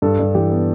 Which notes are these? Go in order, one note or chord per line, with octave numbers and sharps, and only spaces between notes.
G2 A4
G2
E3 G4
B3